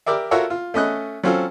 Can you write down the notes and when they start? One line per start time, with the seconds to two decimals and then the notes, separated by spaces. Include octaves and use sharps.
0.06 G4 A#4 D5 E5
0.31 F4 F#4 A4 A#4 C#5 E5
0.50 F4
0.74 A3 C#4 D#5 F#6
1.24 F#3 C4 C#4 F4 A4